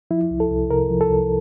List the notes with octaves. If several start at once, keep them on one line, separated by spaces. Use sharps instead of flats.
F3 E4
C2
A4
C2
C3 A#4
F3
A4
C2